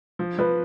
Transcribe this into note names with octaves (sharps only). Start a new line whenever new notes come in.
F3
F3 B4